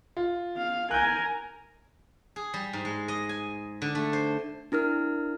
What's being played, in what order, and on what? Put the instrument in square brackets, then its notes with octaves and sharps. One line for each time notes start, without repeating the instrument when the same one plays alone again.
[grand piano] F4
[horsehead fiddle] F5
[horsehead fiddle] A#4 G#5 [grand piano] F#6 G6
[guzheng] G#4
G3
G#2
G#3
D#5
G#5
D3
A3
C5
[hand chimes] D4 E4 A#4 F6